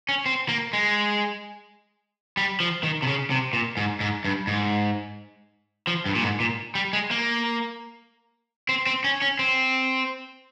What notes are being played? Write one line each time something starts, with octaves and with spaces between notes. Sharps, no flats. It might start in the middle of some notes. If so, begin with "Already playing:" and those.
C#4
C4
A#3
G#3
G3
F3
D#3
C3
C#3
C3
A#2
G#2
G#2
G2
G#2
F3
G2
A#2
G#2
A#2
G3
G#3
A#3
C4
C4
C#4
C#4
C4